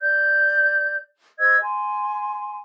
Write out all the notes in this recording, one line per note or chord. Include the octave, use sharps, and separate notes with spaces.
D5 G6
C5 D#5 E6 G#6
G#5 C6